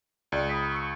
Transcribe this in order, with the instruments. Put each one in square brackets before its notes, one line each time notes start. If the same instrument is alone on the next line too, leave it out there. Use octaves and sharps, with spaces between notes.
[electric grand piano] C#2 [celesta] D5
[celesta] B5 D#6 B6
C#6 E6 C#7